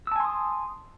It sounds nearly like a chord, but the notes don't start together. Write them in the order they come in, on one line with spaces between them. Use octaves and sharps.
E6 A5 G#5 C6 D#6